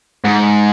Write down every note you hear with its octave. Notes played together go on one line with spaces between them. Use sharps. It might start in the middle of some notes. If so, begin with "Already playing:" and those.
G#2